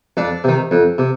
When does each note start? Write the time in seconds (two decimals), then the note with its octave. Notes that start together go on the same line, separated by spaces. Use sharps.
0.17 F2 D4 D5
0.44 C3 D#3
0.71 F2
0.98 C3